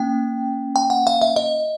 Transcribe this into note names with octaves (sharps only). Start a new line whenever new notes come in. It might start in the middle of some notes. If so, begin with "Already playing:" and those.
Already playing: A#3 C#4 G5
G5
F#5
F5
E5
D#5